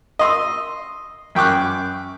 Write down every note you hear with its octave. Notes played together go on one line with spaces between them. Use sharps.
D#5 C6 E6
F#2 G5 C#6 D6 F#6